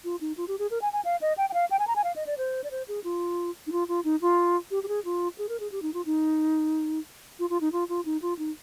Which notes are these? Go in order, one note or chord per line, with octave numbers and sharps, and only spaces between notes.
F4
D#4
F4
G4
G#4
A#4
G#5
G#5
F5
D#5
G5
G5
F5
G5
G#5
A#5
G#5
F5
D#5
D5
C5
D5
C5
G#4
F4
D#4
F4
F4
D#4
F4
G4
G4
G#4
F4
G#4
A#4
G#4
G4
D#4
F4
D#4
F4
F4
D#4
F4
F4
D#4
F4
D#4